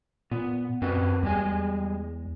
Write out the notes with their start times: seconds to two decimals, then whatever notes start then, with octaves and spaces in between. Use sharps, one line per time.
0.31 A#2 B3
0.82 F#2 C4 F#4 B4
1.23 E2 G3 G#3 G#5